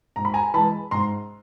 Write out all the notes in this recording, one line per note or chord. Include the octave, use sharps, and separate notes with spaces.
G#2 A#5
B5
G#5 A#5
E3 G#3 A5 B5
G#2 A#5 C6